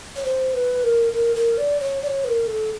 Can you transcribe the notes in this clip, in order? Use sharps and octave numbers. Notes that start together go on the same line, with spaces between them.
C#5
C5
B4
A#4
A#4
A#4
D5
C#5
D5
C#5
B4
A#4
A4